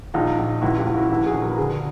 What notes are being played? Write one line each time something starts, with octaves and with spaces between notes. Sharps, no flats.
A#1 D#4 F4
A#1
C#2 E4 F#4
F4 G4
C#2
E4 F#4
A#1 E4 F#4
F#4 G#4
A#1
A#4
B4
D3 G#4 A#4